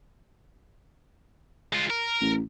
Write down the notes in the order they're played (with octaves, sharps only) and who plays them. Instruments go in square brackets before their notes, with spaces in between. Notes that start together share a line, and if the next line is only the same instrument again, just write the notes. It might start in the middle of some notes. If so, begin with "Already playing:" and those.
[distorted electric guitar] G#3 F4
A#4
[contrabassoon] A1